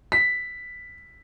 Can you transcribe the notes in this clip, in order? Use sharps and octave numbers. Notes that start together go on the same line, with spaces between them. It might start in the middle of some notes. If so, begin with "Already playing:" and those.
B6